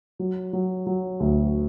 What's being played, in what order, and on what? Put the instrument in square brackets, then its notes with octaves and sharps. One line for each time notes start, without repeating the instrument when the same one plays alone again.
[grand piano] F#3
F#3
F#3
D2